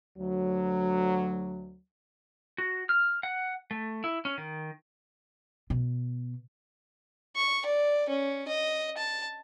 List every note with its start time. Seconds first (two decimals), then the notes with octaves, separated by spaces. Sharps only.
0.17 D2 F#3
2.58 F#4
2.89 F6
3.23 F#5
3.71 A3
4.04 E4
4.25 C#4
4.38 D#3
5.70 B2
7.36 C#6
7.66 D5
8.09 C#4
8.48 D#5
8.98 A5